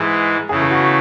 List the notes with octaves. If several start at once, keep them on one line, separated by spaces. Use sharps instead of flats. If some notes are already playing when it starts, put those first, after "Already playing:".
Already playing: G#2 E3 G#3
C#3 E3 A3 G#4
G#4
F#4